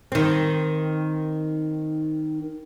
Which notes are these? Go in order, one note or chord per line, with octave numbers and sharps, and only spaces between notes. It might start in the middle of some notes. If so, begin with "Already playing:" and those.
D#3 C4